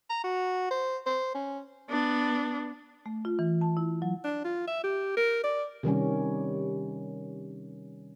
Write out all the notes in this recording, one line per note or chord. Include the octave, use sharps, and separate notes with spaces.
A#5
F#4
C5
C5
C#4
B3 D4
A3
F4
E3
A5
E4
F#3
D4
F4
E5
G4
A#4
D5
C3 D#3 G3 C#4